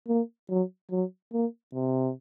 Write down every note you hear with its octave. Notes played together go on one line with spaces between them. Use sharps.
A#3
F#3
F#3
A#3
C3